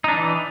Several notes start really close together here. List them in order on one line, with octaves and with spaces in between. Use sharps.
D#4 D4 E3